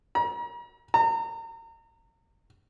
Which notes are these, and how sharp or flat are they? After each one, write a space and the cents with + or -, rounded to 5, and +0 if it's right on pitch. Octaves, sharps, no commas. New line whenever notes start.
A#5 +40
A#5 -35